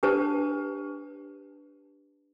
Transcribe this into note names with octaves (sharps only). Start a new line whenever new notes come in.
D4 G4 B4 C#5 A5